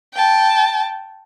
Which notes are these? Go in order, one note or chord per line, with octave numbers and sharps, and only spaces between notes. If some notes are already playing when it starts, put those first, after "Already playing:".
G5 A5